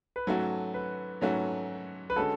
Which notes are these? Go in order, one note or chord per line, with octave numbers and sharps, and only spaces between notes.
B4
G#2 F#3 A3 C#4 F#4 A4
B4
G#2 F#3 A3 C#4 F#4
B4
D3 G#3 C#4 F#4 A4